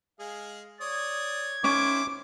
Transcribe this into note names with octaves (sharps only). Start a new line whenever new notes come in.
G#3 G#4 F5
C#5 D5 D#6 G#6
D#3 C#4 E4 C5 D6